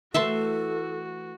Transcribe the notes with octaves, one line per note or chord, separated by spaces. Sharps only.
E3 A3 F#4 A4 E5 A5 C6